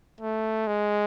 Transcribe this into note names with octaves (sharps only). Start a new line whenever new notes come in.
A3
G#3